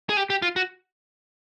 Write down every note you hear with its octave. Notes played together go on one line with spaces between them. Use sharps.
G#4
G4
G4
F4
F#4